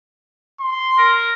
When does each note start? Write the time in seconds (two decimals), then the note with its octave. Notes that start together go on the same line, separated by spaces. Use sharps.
0.60 C6
0.98 A#4